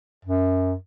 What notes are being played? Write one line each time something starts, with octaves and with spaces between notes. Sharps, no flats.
F#2